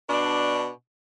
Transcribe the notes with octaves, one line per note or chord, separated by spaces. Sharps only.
B2 D4